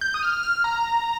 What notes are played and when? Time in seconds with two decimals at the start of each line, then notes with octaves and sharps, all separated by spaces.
0.01 G6
0.14 D#6
0.23 F6
0.43 F6
0.64 A#5